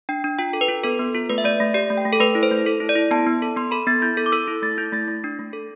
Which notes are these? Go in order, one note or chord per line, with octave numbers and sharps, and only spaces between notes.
D4 G5
D4
F4 G5
A4
B4
F4
B3 A4
B3
F4
A3 B4
E5
A3 D5
A3
G4 D5
A3
G5
A3
A4
A3 B4
E4
C5
A3
A4
E4
D5
E4
B3 A5
B3
A4
B3 C6
A4 B5
B3 A6
E4 G6
A4 G6
D6
A4 E6
E4
A3 A6
E4 G6
A3 A6
A3
D4
A3
A4